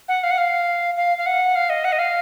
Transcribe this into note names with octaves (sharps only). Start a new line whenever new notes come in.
F#5
F5
F#5
F5
F5
F5
F#5
F5
D#5
F#5
D#5
F5